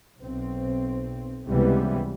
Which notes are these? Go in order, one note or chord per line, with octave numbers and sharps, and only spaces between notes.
B1 C4
C#2 C3 E3 G3 B3